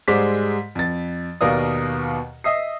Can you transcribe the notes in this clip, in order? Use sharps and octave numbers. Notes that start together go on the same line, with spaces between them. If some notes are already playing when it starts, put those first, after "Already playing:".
G#2 G3 G#3 C5 D6 B6
F2 A6
D#2 B2 A#4 D5 F5 D#6
D#5 E5 D#6 C7